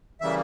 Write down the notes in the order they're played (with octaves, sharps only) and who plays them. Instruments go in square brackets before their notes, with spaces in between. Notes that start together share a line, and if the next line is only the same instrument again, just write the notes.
[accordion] C#3 E3 G3 A#3 E5